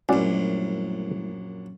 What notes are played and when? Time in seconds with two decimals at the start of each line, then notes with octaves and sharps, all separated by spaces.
0.09 A#1 F#2 G3 A3 C#4 E4 F#4 D5